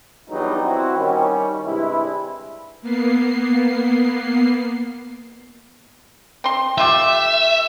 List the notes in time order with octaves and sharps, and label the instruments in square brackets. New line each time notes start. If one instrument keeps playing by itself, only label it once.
[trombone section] E2 G2 F#3 G3 B3 D#4
C4 E4 F#4
D#3 G3 C#4
G2 C3 G#3 E4
[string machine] A#3 B3 C7
[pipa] C4 C6
[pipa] A3 F4 G4 [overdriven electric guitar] E5